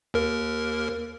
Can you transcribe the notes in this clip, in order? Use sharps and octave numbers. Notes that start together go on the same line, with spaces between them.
D#2 A#4